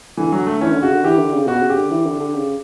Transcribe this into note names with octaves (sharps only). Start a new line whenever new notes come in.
D3 E3
F#3
A3
E3 C#4
D3
C#3 F#4
D3
E3 G4
D3
C#3
B2 F#4
C#3
G4
D3
E3
D3
D3
C#3